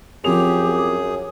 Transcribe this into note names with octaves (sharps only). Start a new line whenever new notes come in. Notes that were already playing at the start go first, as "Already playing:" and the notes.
F#2 F3 C4 G4 G#4 F7